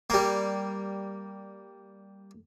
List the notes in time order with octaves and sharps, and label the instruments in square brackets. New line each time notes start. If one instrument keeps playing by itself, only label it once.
[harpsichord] G3 A#3